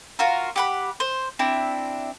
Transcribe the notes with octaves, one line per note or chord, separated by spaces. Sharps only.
F4 F#4 A#4
G4 F#5 B5
C5
C4 D4 E4